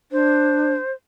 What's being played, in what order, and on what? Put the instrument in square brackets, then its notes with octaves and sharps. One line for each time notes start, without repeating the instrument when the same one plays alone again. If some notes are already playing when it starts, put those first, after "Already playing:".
[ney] D4 [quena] C5